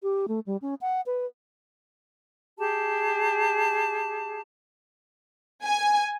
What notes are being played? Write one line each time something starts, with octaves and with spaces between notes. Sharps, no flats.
G4
A3
G3
C#4
F#5
B4
G4 G#4 A5
G#5